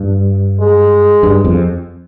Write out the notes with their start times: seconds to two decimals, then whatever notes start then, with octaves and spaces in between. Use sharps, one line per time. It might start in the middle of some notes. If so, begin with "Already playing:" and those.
Already playing: G2
0.60 G#3
1.23 G2
1.44 F2